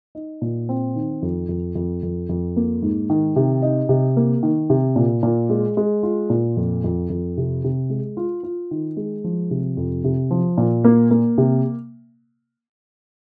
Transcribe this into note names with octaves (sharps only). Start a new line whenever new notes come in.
D#4
A#2
C4
D#3
F2
F2
F2
F2
F2
A#3
G#2
D#3
C3
D#4
C3
A#3
D#3
C3
A#2
A#2
G#3
G#3
F4
A#2
F2
F2
F2
C3
C3
G#3
F4
F4
D#3
G#3
F3
C3
F2
C3
F3
A#2
A#3
A#3
C3